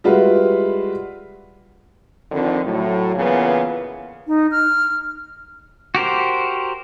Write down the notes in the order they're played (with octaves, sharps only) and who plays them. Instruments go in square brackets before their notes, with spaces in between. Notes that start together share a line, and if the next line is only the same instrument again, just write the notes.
[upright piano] G3 G#3 F4 F#4 B4 E5
[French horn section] F2 D3 D#3 C4
A2 F#3
A#2 C#3 E3 B3
[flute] D#4
F6
[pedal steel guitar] F#4 G4 A#4 C5